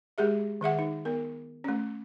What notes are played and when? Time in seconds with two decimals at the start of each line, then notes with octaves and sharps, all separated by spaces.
0.18 G#3 G4 G#4 E5
0.61 D#3 G#4 E5 F#5
0.79 D#4
1.05 B3 A#4
1.64 A3 C#4